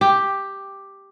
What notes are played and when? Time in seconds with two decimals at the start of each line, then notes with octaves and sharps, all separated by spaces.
0.01 G4